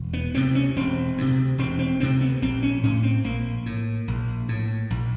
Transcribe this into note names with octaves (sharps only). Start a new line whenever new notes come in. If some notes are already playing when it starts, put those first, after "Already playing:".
Already playing: E1
B3
D2 C3 C4
C#4
E1 C4
D2 C3
E1 C4
C4
D2 C3 C4
B3
A#1 C4
C#4
A2 C#4
C4
A#1 A#3
A2
A#1
A2
A#1